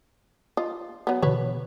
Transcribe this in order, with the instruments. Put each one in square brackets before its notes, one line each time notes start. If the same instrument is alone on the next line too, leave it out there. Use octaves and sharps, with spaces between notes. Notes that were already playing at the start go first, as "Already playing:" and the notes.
[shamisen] F4 D#5
F#3 B3
[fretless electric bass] B2 D3 E3 [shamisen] B4 C#5